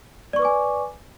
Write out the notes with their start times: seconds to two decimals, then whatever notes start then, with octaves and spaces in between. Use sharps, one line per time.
0.33 D5
0.36 C#6
0.39 B4
0.42 D6
0.45 G#5